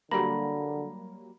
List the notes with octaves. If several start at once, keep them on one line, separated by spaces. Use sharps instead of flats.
D3 F#3 G3 A#3 A#5 B5 A#6